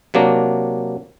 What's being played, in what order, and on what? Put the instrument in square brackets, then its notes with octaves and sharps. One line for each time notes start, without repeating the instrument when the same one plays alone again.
[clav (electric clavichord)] C3 F#3 A#3 D4